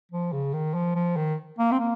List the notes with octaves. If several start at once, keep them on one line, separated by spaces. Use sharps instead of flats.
F3
C#3
D#3
F3
F3
D#3
A#3
C4
A#3